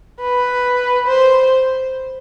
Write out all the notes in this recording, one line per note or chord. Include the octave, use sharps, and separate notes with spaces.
B4
C5